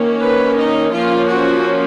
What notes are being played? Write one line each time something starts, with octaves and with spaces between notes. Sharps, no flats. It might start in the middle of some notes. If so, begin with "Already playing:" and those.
Already playing: D#3 A#3 C#4
B4
D#4
F3 A#3 C#4 F4
F#4